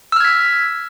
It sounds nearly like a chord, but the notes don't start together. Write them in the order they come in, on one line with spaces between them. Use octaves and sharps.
E6 F6 G#6 B6